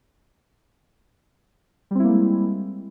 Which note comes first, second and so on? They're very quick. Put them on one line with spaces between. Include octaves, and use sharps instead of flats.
G3 C4 E4 A#3 G#3